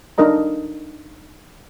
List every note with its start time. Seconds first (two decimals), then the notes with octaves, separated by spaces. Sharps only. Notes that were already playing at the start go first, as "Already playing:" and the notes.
0.18 D4 D#4 A#4 D#5 A#5